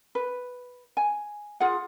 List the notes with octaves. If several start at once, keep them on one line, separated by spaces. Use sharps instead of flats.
B4
G#5
F4 G#4 F#5